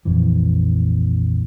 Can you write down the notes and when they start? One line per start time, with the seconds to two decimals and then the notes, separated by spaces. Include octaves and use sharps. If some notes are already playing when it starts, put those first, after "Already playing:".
0.05 A#1 F2 E3